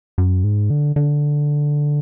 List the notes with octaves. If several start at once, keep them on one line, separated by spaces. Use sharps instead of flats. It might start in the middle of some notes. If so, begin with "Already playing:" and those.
F#2
G#2
D3
D3